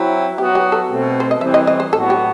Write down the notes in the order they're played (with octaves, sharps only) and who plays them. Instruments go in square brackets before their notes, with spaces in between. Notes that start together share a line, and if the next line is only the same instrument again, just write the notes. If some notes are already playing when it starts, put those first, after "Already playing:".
Already playing: [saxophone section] F#3 C4 E4
[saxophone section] F#3 B3 F#4 [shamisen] G4
[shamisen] G4
A4
[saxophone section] B2 A3 C4
[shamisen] C5
D#5
[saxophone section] E3 G3 C4 [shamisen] E5
[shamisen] D#5
D#5
C5
[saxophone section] A2 F#3 B3 F#4 [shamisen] A4
[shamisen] G4